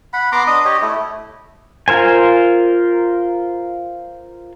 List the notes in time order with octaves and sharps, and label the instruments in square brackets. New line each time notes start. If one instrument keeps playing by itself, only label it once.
[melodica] F#5 B5
B3 A#5 C6 D6
D4 D#5 D#6
G4 C#5 D#5
A3 E4
[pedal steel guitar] F4 A#4 C5 G#5